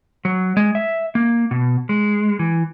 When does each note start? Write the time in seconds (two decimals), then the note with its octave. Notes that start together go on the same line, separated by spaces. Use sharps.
0.25 F#3
0.57 G#3
0.75 E5
1.15 A#3
1.51 B2
1.89 G#3
2.39 E3